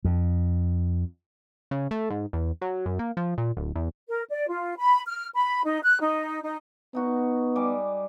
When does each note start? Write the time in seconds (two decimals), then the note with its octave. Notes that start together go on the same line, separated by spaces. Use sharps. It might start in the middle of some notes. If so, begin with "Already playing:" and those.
0.05 F2
1.71 C#3
1.91 A3
2.10 G#2
2.33 E2
2.62 F#3
2.86 F#2
2.99 A#3
3.17 F3
3.38 A#2
3.57 D1
3.76 E2
4.08 A#4
4.29 D5
4.48 F4
4.78 B5
5.07 F6
5.35 B5
5.65 D#4
5.84 F#6
6.01 D#4
6.43 D#4
6.95 B3 D#4 F#4
7.55 G3 G#5 D6